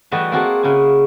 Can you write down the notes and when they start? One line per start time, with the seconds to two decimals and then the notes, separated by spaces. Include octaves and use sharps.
0.11 E3 G3 A3 F#4 D#5 E5
0.31 A#3 C4 F4 F#4 G#4 A4
0.63 C#3 E4 F#4 G#5